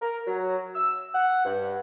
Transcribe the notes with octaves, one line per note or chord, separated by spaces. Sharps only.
A#4
F#3
E6
F#5
G2